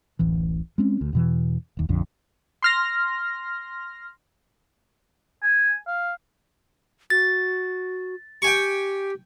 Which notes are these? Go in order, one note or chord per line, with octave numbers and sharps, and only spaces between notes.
D1 A1 E3
G#3 C4 C#4
D2
E2 B2 E3
E1 D#2
A#1 F2 D3
C6 F6 A#6
G#5
F5
F#4 A6
G4 G5 G#5 C#6